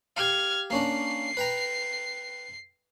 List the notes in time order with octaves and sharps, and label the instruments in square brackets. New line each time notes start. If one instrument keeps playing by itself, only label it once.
[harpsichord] G4 F5 [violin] F6 G#6
[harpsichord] A#3 C#4 D4 [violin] C7
[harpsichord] B4 G5 A#5